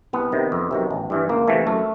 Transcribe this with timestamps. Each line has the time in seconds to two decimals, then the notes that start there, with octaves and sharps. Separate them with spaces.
0.13 C2 B3
0.32 C3 D#3
0.52 F2
0.71 C3 D#3 F#3
0.91 A1
1.10 G2 E3
1.29 C#2 A#3
1.48 C3 E3 A3
1.67 F#2 A3